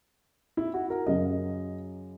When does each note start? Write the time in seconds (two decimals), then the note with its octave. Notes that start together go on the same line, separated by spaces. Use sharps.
0.57 E4
0.74 F#4
0.90 A#4
1.07 F#2 C#3 F#3 D#5